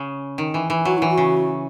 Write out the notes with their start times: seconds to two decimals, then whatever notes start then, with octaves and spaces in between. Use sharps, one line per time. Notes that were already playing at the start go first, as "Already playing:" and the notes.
Already playing: C#3
0.38 D#3
0.54 E3
0.70 E3
0.85 F#3 F#4
0.98 E3 E4
1.09 F#4
1.18 C#3